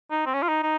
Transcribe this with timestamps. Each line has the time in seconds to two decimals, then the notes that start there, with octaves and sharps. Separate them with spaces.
0.11 D#4
0.26 C4
0.34 C#4
0.43 F4
0.48 D#4
0.63 D#4